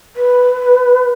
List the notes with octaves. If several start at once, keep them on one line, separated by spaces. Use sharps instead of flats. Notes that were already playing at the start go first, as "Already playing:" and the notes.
B4